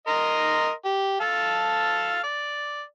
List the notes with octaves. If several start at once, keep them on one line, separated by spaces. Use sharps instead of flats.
A#4 D#5 C6
G4
A4 F5 A5
D5